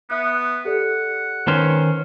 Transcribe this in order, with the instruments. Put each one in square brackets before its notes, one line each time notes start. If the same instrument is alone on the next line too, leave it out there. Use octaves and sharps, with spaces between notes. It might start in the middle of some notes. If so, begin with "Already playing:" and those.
[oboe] B3 [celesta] E5 D#6 F#6
[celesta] G4 A4 D5 [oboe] F#5
[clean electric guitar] D#3 C#4 C5 [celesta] B4